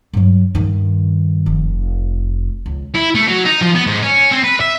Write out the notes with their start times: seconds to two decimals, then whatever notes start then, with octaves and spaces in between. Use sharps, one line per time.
0.13 G2 F#3
0.55 G2 D#3
1.46 F1
2.66 C#2
2.94 E4
3.15 A3
3.27 F#3
3.45 D#4
3.61 F3
3.75 B3
3.87 G#2
4.02 C#4
4.31 C4
4.44 B4
4.61 E5